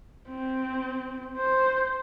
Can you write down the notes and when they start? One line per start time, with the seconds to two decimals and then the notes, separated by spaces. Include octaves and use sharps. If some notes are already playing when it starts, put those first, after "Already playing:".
0.29 C4
1.37 C5